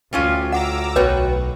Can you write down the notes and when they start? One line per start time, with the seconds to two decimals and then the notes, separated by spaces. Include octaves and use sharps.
0.13 D2 G3 C#4 F4
0.52 F#5 A#5 D6 E6
0.96 B1 B3 F#4 B4 C#5 G5